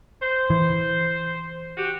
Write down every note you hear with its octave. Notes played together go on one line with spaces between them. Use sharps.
C5
E3
F#4 G4